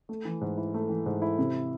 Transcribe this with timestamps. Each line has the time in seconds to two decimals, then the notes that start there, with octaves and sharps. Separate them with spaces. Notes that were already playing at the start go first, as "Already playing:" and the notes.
0.09 A3
0.25 E3
0.41 G#2
0.57 E4
0.74 A3
0.89 E3
1.06 G#2
1.22 E4
1.38 C3